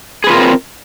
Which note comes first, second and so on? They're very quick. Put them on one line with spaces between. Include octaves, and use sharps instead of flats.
G#4 B4 F4 A#4 C4